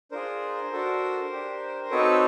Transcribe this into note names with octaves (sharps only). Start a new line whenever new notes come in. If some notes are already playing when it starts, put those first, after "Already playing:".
D4 F4 G#4 A#4 C5
D4 F#4 A4
D4 G4
C4 D#4 F#4 A4 B4 C#5